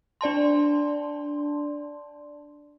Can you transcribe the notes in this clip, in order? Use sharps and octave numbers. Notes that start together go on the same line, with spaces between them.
D4 D5 A5 C6